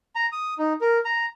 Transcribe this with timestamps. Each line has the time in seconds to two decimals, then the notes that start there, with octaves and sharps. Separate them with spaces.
0.15 A#5
0.32 D#6
0.58 D#4
0.81 A#4
1.05 A#5